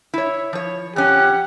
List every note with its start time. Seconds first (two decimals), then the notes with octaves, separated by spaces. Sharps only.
0.14 E4 C#5
0.53 F3 C#5
0.96 F2 C#4 G4 F#5